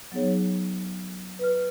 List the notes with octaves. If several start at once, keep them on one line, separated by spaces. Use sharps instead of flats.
F#3 B3 D#4 G#4 C#5
B4 F6